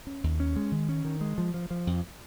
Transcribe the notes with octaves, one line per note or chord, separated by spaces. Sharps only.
C#4
D#2
C#4
G#3
D#3
C#4
D#3
G#3
F3
F3
F3
F2